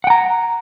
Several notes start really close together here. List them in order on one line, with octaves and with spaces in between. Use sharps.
F#5 G5 A#5